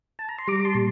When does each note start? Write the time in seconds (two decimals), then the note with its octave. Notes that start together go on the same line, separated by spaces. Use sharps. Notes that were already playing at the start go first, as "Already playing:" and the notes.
0.19 A5
0.29 A#5
0.39 C6
0.48 G3 A#5 D6
0.60 D6
0.65 A5 C6
0.75 A#2